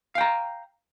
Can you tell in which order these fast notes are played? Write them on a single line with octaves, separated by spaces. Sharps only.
F5 G5 A#5